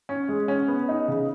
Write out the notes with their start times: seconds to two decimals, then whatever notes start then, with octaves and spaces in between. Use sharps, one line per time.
0.09 C#4
0.28 G#3
0.48 C#4
0.68 B3
0.89 D#4
1.08 C#3